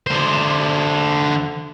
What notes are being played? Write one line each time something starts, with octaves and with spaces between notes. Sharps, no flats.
D3 C5